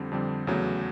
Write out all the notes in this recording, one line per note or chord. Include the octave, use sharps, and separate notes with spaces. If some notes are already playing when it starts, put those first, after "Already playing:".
Already playing: F2 D3 G3 C4
F2 D3 G3 C4
E2 C#3 F#3 A3